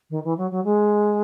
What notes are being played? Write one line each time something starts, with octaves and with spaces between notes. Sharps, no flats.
D#3
E3
F#3
F#3
G#3